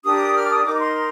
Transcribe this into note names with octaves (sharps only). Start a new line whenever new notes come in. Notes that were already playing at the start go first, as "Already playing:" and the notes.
D4 G4 A#4 D#6
F6
D6
D#6
D#4 A#4 D6
D6
C6